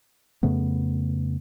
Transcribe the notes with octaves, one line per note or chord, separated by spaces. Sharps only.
F2 C#3 A3 B3